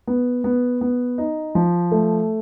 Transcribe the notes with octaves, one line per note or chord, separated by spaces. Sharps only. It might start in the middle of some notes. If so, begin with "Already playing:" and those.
B3
B3
B3
D#4
F3
A3